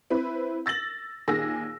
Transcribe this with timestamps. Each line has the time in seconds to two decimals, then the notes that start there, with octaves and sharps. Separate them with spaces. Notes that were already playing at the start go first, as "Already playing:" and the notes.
0.10 C4 E4 B4
0.66 E6 A6 A#6 F#7
1.28 D#2 A#2 G#4 E6 A#6